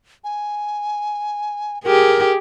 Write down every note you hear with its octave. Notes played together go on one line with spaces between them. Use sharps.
G#5
G4 G#4 A#4